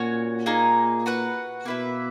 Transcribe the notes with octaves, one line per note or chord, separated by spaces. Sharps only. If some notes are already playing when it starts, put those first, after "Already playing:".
Already playing: A#2 C#4 F#4 C#5
A#3 D#4 G#4
F#4 B4 F#5
B2 A#3 E4 B4 E5